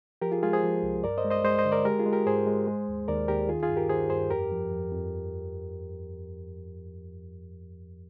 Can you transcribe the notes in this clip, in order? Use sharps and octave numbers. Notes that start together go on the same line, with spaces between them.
F3 G4 A#4
F4 G#4
G#3 F4 G#4
G#4 C5
F3
C2
G2 A#4 D5
C5 D#5
G#3
C5 D#5
G#3 C5 D#5
C5 D#5
D3
A#4 D5
G#3 G4 A#4
F4 G#4
G#3
G4 A#4
G#2 G#4 C5
G#3
G#3
D#2
D#2 A#4 D5
D#2 G4 A#4
D#3 F4 G#4
F4 G#4
G2
G4 A#4
D#3 G#4 C5
G2 G#4 C5
F2 G4 A#4
F3
F2
F2